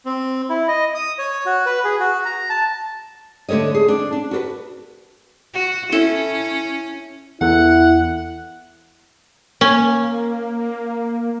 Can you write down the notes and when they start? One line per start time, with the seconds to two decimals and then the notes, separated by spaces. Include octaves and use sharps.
0.06 C4
0.49 E4
0.69 D#5
0.94 D#6
1.19 C#5
1.46 F#4
1.66 B4
1.85 G#4
2.00 F#4
2.25 A#5
2.49 A5
3.49 D3 A3 A4 C#5 D#5
3.75 G#4
3.88 D4
4.13 D4
4.31 F#4 A4 B4
5.54 F#4
5.92 C#4 E4 A4
7.41 E2 E4 A4 F#5 F#6
9.61 A#3 C#4